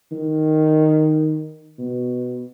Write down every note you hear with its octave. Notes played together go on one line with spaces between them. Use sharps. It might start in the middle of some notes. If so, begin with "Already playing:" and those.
D#3
B2